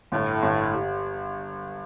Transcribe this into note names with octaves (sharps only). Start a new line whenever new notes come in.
G1 A2
G1
G3